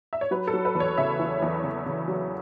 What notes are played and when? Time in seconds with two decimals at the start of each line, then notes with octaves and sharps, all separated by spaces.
0.13 E5
0.21 C#5
0.31 F#3 B4
0.47 A4
0.54 F#3
0.65 B4
0.75 E2
0.80 C#5
0.98 C#3 E5
1.19 E2
1.42 E2
1.64 C#3
1.86 C#3
2.08 F#3